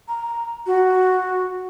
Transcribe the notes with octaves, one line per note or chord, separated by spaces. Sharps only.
A#5
F#4